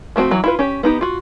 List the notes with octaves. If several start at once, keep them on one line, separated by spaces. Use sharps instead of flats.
F3 A3 C4 F#4
E3 F#3
E4 F4 B4
C#4 G4
B3 D#4 G4
F4 F#4